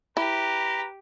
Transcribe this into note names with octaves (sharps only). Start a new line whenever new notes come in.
E4 G4 B4 A#5